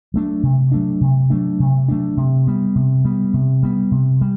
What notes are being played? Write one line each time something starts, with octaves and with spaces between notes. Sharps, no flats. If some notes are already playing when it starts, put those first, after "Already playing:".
F#3 A3 D4
C3
F#3 A3 D4
C3
F#3 A3 D4
C3
F#3 A3 D4
C3
G3 B3
C3
G3 B3
C3
G3 B3
C3
G3